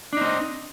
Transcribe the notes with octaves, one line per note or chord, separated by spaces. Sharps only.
C4 D4 D#4 D#5